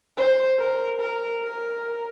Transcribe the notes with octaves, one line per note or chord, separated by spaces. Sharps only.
C5
A#4
A#4
A#4